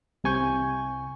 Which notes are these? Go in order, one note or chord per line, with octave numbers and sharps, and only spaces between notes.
C2 C3 G#5 C#6 G6